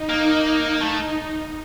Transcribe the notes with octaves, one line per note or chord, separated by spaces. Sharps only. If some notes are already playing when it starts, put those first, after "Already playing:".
Already playing: D#4
A#3
A3 D#4